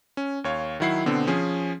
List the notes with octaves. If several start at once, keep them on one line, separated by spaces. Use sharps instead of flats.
C#4
D#2 C#5 F5
D#3 F#3 E4 F#5 C7
B2 D3 B3 C4
F3 C#4 G#4